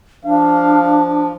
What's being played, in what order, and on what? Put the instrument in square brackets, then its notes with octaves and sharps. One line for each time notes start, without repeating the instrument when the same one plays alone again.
[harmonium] F3 [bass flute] D4 [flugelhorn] F5